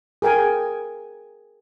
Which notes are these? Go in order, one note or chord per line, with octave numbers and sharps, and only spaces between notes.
G#4 A#4 G5 G#5